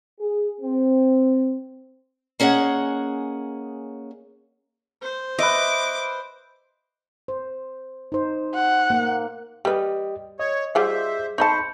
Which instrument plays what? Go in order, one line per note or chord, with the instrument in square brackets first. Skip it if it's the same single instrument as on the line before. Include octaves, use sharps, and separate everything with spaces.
[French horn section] G#4
C4
[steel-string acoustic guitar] A#3 C#4 G#4 D#5 F#5
[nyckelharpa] C5
[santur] B4 E5 [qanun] D#5 [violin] D6
[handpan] C5
D#4 C5
[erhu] F#5
[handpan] A#3
[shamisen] G3 B4 [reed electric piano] G4 D#5
[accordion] C#5 [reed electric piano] D#5
[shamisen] G3 F4 F#5 [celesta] G#4 D6 [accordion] C5 E5
[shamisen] D#4 D#5 A5 [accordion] C5 [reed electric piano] B5 C#6 [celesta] G6 C#7